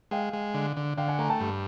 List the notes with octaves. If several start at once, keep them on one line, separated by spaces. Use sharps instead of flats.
G#3 F5 G5
G#3
D3
D3
D3 F5 G5
F#5 G#5
A3 G#5 A#5
G5 A5
G2